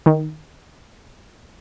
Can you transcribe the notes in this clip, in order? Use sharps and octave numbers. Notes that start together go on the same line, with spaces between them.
D#3